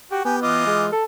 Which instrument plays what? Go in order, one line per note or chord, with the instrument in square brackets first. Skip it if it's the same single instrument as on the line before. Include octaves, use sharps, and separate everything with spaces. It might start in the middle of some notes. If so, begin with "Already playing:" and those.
[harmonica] F#4 [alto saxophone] G4
[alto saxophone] B3 [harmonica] G4 [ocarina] G#5
[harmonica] E3 F4 D#5 [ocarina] D6
[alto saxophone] G#3
[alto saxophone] A4 [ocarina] A5